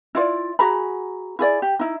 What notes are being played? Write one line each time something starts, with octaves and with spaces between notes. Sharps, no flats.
E4 F4 D5
F#4 G#4 A#5 B5
E4 G#4 D5
G4
D#4 E4